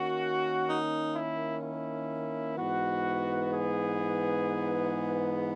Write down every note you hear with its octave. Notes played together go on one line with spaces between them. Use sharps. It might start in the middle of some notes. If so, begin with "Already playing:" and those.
Already playing: D#3 A#3 C#4 F#4
D#4
E4
E4
G#2 E3 B3 F#4
G#4